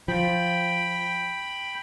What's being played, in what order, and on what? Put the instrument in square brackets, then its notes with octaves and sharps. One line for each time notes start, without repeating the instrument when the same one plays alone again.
[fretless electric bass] F3 [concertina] G5 B5